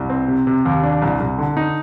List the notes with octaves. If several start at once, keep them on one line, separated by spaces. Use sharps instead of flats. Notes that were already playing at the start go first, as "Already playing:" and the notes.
Already playing: C2
C4
C3
C3
D#2
D4
C2
C2
D3
D#4